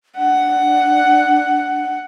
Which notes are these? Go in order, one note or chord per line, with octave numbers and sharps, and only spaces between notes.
D4 F#5